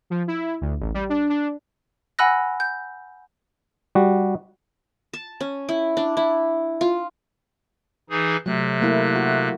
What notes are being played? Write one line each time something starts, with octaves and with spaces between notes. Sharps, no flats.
F3
E4
D2
A1
G3
D4
D4
F#5 G#5 B5 E6 F#6 A#6
G6
G3 F#4
A5
C#4
E4
D4
E4
F4
E3 D#4 G#4
C3 F#3 A3 F#6
A3 A#3 E4
F#4